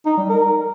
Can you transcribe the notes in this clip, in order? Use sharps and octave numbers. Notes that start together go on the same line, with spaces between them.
D#4
G3
A#4